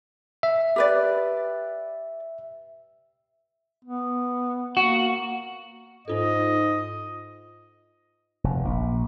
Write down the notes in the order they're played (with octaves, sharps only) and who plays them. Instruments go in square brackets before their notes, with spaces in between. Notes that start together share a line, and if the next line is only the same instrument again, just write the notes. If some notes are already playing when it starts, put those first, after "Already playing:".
[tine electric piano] E5
[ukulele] G4 B4 D5
[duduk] B3
[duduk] A#3 [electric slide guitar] F#4
[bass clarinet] G#2 [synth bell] D#4 F4 A4 [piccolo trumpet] D#5
[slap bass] F1
A#1